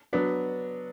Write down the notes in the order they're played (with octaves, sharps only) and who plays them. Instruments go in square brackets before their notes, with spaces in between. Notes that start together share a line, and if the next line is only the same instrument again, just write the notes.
[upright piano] F#3 B3 D4